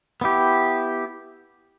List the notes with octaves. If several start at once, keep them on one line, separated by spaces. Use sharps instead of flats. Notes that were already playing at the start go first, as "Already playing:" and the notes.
B3 E4 G4